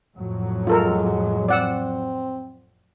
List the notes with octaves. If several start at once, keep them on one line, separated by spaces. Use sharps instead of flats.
F2 A2 F#3
G#3 F4 A4 A#4
C4 D5 F#5 E6